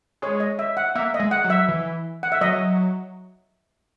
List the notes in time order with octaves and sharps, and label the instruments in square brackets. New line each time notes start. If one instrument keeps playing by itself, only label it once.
[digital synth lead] G#3 [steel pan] C#5
[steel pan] D#5
E5
F#5
[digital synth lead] A#3 [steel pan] E5
[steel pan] D#5
[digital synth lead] G#3
[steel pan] F#5
[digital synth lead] F#3
[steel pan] E5
[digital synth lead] E3
[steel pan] F#5
E5
[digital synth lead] F#3 [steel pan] D#5